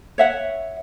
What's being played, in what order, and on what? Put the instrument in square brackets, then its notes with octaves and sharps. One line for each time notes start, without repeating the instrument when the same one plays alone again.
[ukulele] C#5 E5 F#5